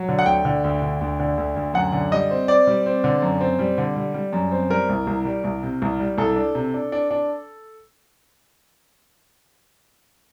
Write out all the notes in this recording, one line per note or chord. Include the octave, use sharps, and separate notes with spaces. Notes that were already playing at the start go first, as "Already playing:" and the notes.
Already playing: F#3
D3
F#5
D2 G5
D3
D2
D3
D2
D3
D2
D2
F#2 F#5
D3
G3 D#5
C4
C4 D5
G3
C4
D3
F#2
C4
G3
D3
G3
G3
F#2
C4
G3 A#4
C2
C2
G3
C2
C3
C2
G3
C2 A4
D4
C3
D4
D4
D4